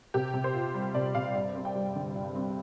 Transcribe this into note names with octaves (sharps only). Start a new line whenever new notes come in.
C3 G4
C3
C5
F4
G3
C3 D5
C3 F5
G2 D5
C4
G5
G3
D3
G2
C4